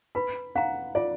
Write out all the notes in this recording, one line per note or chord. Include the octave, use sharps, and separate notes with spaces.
B4 B5
F5 F#5 A#5
F4 D5